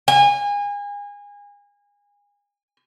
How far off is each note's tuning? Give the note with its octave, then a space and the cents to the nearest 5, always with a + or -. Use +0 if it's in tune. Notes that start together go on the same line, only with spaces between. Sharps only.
G#5 -30